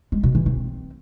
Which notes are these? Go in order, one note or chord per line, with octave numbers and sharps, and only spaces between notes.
G#3
B2
E3
C4